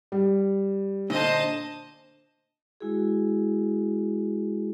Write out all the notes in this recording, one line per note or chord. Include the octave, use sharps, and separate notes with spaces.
G3
A#2 D3 C5 D#5 A5
G#3 E4 F#4 G#4